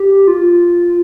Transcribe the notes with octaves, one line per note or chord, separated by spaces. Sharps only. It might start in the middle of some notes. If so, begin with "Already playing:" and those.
Already playing: G4
F4